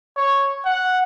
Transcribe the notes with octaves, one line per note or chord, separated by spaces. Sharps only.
C#5
F#5